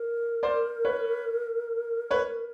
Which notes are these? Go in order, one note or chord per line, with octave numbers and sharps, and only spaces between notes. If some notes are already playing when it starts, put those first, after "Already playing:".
Already playing: A#4
C5 D5
B4 C#5
B4 C#5